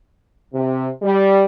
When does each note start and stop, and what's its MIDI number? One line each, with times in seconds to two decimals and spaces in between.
0.54 0.88 48
1.02 1.44 55